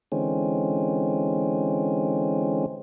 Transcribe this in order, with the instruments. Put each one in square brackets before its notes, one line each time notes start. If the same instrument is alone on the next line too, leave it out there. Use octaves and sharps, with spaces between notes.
[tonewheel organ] D3 E3 G#3 C4 C#4